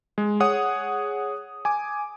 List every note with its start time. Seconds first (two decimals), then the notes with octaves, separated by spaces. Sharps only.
0.18 G#3
0.40 G#4 C#5 F#5 D#6
1.65 G#5 D6